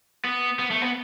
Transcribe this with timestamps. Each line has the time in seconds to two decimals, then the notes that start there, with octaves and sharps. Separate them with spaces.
0.24 B3
0.59 B3
0.71 A3
0.82 B3